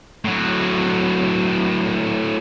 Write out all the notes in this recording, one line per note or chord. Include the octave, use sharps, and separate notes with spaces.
A2 F#3